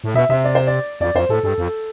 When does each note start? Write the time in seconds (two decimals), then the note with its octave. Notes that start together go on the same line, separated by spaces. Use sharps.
0.04 A2
0.15 B2 E5
0.29 C3 E5
0.44 D5
0.55 C5
0.67 D5
1.01 F2 D5
1.15 F2 C5
1.29 A2 A4
1.43 G2 A4
1.58 F2